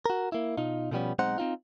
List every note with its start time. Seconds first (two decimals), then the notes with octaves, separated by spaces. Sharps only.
0.06 F#4 A#4
0.32 A#3 E4
0.57 B2 D#4 F4
0.91 B2 D3 F3 G3 B3 C#4
1.19 B1 G#3 C4 D#4 C5 F#5
1.38 C4 D#4 F4